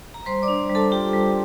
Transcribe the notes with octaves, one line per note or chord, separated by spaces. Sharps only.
A#5
G3 C5 C6
D5 D6
D4
G3
A4 A5
F4 G4 G5
G3